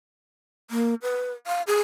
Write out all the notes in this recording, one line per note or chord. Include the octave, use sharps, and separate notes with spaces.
A#3
B4
F5
G#4